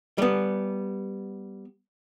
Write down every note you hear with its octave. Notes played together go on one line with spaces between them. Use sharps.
G3 B3